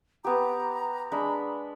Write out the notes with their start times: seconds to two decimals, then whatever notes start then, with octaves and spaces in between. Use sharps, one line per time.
0.24 B3 G4 A#5
1.12 G#3 D4 B5